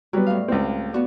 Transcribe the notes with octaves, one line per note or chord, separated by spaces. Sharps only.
F#3 G3 B3
A2 F5
C#2 C4
B3 F#4 D5